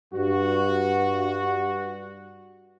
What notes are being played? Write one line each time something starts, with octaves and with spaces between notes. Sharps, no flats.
G2 F#4